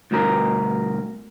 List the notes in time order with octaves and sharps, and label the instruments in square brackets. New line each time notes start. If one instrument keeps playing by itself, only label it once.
[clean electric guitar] D2 G2 B2 A#4